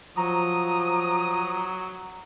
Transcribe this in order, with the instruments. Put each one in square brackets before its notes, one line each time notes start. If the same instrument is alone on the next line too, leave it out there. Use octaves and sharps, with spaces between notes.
[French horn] F3 [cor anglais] F#3 [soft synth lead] A#5 [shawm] D#6